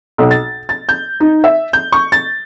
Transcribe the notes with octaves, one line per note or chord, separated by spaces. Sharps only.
B1
A6
A6
G6
D#4
E5
G6
C#6
A6